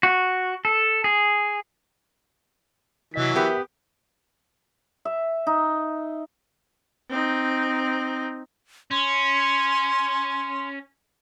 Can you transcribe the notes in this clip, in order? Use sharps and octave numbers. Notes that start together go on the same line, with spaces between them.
F#4
A4
G#4
C3 E3 F#3 D#5 B6
B3 G4 A#4 E5 B5
E5
D#4
C4 D#4
C#4 C6